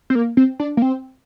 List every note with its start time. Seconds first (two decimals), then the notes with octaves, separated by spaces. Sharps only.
0.10 C4
0.15 A#3
0.37 C4
0.60 D4
0.77 A#3
0.82 C4